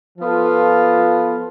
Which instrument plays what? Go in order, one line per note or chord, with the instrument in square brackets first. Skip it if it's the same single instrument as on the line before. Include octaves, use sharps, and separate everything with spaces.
[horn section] F3 B3 F4 A4